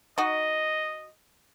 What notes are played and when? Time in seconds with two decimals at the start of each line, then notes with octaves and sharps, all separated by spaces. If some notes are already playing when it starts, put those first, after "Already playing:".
0.18 D#4 F#4 D#5